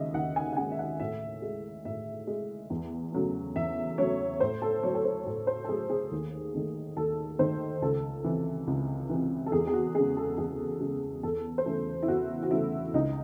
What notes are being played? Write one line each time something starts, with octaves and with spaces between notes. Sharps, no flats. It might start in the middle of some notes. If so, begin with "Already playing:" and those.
Already playing: D#2 C#3 G#3 D#5 E5
D#2 F#5
G#5
F#5
C#3 G#3 G#5
E5
F#5
A2 E5
G#3
A2 E5
G#3
E2
C#3 F#3 A3
E2 E5
C#3 F#3 A3 C#5
A2 C5
A4
F#3 A3 C#5
A4
C5
A2 A4
C5
A4
F#3 A3 G#4
G#4
D#2
D#3 A3
D#2 A4
D#3 A3 C5
C#2 A4
C3 E3
C#2
C3 E3
A4
E2 G#4
G#4
F#4
C#3 G#3 G#4
A4
E2 G#4
C#3 G#3
E2 A4
C5
C#3 E3 A3 A4
E4
E2 F#4
F#4
C#3 E3 A3 E4
C#2 D#4